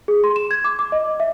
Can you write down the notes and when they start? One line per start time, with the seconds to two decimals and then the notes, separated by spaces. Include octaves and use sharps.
0.08 G#4
0.24 C6
0.36 E7
0.51 G#6
0.64 D6
0.79 D6
0.92 D#5
1.20 E5